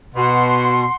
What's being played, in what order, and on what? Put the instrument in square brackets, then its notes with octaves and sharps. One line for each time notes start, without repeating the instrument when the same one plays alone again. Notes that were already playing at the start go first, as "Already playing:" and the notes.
[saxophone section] B2 [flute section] F#5 C6